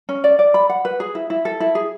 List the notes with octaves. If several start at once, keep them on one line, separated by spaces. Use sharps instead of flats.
C#4
D5
D5
B5
F#5
B4
G#4
E4
E4
A4
E4
G#4